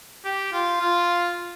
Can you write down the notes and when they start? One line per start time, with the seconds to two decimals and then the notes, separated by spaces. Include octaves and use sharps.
0.25 G4
0.52 F4
0.80 F4